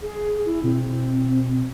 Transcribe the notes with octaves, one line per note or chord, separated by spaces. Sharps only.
G#4
E4
B2 C4